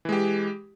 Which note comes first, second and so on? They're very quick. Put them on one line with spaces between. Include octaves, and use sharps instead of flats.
E3 G#3 G4